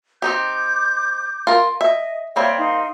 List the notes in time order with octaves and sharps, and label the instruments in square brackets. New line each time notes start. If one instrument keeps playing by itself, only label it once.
[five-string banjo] C4 D#4 G4 [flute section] D6 G6
[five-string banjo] F4 A#4
[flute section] D#5 [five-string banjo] E5
[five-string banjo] G3 A#3 C4 [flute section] C#5 E5 G5
[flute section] D#4 F5 C6